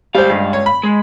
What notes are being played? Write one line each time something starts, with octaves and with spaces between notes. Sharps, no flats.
C#2 G3 C5 F5
G2
C#5
B5
G#3